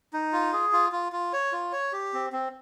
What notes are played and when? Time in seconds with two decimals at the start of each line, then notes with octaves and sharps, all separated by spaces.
0.13 D#4
0.32 F4
0.53 G#4
0.73 F4
0.92 F4
1.12 F4
1.33 C#5
1.53 F4
1.72 C#5
1.93 G4
2.13 C4
2.33 C4